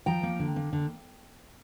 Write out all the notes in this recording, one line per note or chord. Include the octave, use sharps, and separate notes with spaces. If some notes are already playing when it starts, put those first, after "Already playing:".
F3 G5 A#5
A#3
D3
A#3
D3